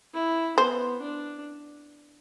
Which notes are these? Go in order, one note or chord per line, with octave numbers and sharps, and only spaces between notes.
E4
B3 C5
D4